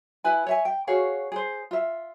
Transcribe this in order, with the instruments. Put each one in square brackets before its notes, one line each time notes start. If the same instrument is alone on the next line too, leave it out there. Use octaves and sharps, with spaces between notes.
[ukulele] E4 B4 G#5
C#5 E5 G#5
G5
F#4 G#4 C#5 F5
G#4 C5
F4 E5